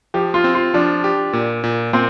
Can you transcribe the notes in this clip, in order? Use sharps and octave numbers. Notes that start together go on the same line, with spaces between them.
F3 G4
F4
C4
F4
F3 D4
G4
A#2
A#2
A#2 C4